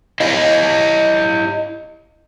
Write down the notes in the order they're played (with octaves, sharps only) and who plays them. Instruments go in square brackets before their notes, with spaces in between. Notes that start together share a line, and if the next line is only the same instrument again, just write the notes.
[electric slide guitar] E4 G4 D#5 F5